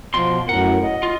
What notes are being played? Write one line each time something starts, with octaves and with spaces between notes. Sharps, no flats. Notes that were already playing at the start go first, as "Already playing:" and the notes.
B2 F3 C6
F#2 A2 A#4 F#5
D#5
F4